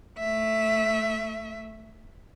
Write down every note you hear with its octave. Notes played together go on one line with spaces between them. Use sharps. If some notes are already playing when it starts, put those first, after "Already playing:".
A3 E5